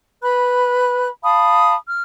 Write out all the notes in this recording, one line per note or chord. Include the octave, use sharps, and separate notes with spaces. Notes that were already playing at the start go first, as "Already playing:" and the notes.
B4 B5 F#6
F5 A5 B5 D#6
F6